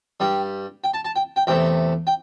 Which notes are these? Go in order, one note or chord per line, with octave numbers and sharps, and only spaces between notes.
G2 G3 G5
G5
A5
A5
G5
G5
E2 C3 A3 G5
G5